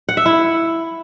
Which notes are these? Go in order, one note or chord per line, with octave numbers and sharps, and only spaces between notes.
F#5
E5
E4